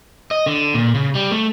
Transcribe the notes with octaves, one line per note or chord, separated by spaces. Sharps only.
D#5
D3
A#2
C#3
G3
A3